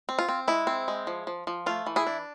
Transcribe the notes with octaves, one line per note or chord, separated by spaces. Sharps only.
C4
F4
C4
G#3 E4
C4
G#3
F3
F3
F3
A3 F4
E3
E4 G#4
D4